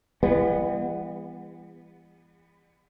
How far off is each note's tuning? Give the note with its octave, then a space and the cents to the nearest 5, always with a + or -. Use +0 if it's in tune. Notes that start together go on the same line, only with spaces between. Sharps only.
E3 +35 G3 +45 B3 +0